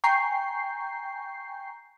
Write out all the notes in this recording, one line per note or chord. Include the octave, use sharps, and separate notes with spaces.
G5 G#5 A#5 C#6 G6 C7